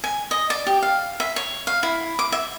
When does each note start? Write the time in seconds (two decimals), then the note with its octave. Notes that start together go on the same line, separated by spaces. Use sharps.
0.04 G#5
0.31 D#5
0.50 D5
0.67 G4
0.82 F5
1.20 E5
1.36 C#5
1.67 F5
1.83 E4
2.19 D6
2.32 E5